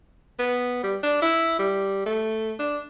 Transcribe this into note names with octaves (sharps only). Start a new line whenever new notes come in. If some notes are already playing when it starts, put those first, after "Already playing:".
B3
G3
D4
E4
G3
A3
D4